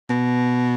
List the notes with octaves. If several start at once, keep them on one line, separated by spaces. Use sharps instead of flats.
B2